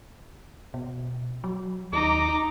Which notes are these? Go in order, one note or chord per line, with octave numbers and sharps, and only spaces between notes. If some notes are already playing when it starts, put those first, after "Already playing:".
B2
F#3
D#2 D#4 A#5 D6